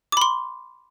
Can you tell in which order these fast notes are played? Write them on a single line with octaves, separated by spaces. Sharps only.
D6 B5 C6